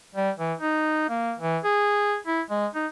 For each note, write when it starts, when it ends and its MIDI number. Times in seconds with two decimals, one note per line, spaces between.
0.15 0.31 55
0.38 0.54 52
0.60 1.09 63
1.09 1.33 58
1.39 1.58 52
1.64 2.16 68
2.27 2.42 64
2.50 2.67 56
2.75 2.87 63